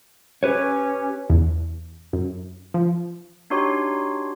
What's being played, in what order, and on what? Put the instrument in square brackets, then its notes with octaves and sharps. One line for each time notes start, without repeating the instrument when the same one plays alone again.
[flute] C#4 [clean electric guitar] G4 B4 C#5
[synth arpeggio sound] E2
F#2
F3
[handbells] D4 D#4 F#4 G4 C#5 C6